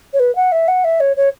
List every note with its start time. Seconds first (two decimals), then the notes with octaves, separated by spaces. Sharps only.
0.13 C#5
0.20 B4
0.36 F#5
0.52 E5
0.68 F#5
0.84 E5
1.00 C#5
1.17 C#5